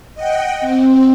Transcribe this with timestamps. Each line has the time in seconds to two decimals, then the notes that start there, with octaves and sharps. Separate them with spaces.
0.14 D#5 F#5 G5
0.61 C4